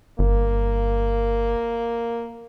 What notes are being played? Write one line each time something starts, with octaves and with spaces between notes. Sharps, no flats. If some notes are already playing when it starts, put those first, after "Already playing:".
G1 A#3